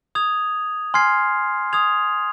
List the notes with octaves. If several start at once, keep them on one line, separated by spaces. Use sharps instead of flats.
D#6 G#6 F7
G#5 C6 F6 G#6 C7
D#6 G#6 F7